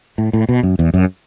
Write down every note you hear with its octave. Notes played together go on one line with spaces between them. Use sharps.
A2
A2
B2
F#2
E2
F#2